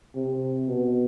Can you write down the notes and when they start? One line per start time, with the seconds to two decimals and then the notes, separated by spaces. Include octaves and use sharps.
0.15 C3
0.68 B2